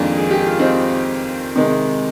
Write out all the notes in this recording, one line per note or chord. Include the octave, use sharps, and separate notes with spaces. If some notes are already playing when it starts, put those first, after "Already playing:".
Already playing: F2 D#3 G#3 A#3 D4
G#4
G4
F4
C4 D#4
C3 D#3 G#3